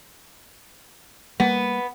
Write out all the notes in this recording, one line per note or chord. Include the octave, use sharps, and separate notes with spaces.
G3 A#3 B3